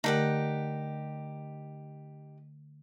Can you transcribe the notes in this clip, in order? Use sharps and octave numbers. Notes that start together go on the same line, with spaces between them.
D3 A3 D#4 G4 A#4 F#5